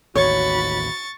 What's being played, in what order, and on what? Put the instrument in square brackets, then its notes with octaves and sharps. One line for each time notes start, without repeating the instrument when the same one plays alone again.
[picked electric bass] A1 D#2 [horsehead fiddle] F#4 B5 [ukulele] C#5 [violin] C#6 A6